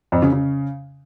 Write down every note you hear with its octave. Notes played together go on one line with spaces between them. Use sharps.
F2
C#3
C#3